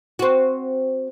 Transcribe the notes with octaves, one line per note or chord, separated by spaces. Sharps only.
C4 F#4